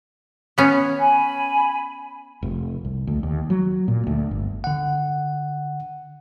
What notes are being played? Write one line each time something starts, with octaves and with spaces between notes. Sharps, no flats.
B3 C#4
G#5 B5
F1
C2
D2
D#2
F#3
A#2
D2
G1
D3 F#5